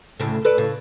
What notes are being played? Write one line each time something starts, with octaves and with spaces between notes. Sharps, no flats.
D2 A2 C#3
A4 B4 D5
A2 C#3